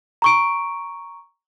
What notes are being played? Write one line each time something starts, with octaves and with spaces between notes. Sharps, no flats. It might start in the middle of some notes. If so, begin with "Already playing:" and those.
A#5 C#6 D7